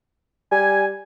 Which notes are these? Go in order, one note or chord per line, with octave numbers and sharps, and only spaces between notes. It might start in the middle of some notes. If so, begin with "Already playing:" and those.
G3 G#5